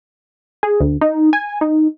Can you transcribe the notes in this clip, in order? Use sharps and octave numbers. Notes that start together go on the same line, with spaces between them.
G#4
D2
D#4
G#5
D#4